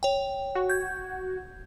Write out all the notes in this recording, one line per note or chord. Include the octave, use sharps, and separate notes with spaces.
C#5 G5
F#4
G6 G#6